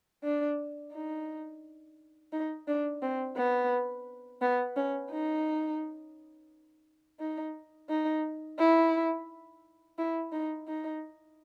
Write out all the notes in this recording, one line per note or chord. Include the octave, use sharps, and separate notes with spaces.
D4
D#4
D#4
D4
C4
B3
B3
C#4
D#4
D#4
D#4
E4
E4
D#4
D#4